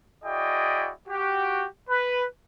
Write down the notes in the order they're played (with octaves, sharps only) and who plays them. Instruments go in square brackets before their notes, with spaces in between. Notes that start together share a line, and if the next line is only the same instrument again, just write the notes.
[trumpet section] E4 F#4 G#4 D5 D#5 G5
F#4 G4
B4